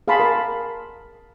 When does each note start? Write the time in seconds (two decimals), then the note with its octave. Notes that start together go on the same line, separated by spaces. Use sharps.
0.08 G#4 F5 F#5 A5 B5 C6
0.20 A#4 B5